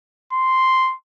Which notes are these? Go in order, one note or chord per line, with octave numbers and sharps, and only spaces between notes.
C6